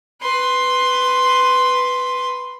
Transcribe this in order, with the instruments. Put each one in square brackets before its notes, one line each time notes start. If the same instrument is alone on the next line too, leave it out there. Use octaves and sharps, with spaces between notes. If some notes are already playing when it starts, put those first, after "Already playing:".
[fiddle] B4 C6